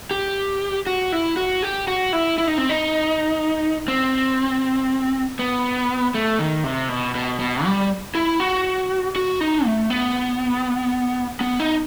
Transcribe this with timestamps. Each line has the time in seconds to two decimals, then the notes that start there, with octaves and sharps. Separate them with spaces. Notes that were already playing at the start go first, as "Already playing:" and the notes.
0.11 G4
0.87 F#4
1.12 E4
1.37 F#4
1.62 G4
1.88 F#4
2.13 E4
2.38 E4
2.47 D#4
2.58 C4
2.69 D#4
3.88 C4
5.39 B3
6.15 A3
6.39 D#3
6.64 C3
6.89 B2
7.15 B2
7.40 B2
7.65 G3
8.15 E4
8.40 F#4
9.16 F#4
9.41 D#4
9.65 A3
9.90 B3
11.41 B3
11.60 D#4